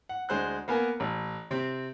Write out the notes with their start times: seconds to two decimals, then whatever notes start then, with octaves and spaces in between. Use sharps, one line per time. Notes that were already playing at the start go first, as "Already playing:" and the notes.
0.09 F#5
0.29 D2 G#3 C5 F#6
0.68 A#3 B3 A#4 G#5
1.00 A1
1.51 C3 C4